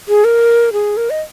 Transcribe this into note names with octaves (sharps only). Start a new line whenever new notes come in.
G#4
A#4
G#4
A#4
D#5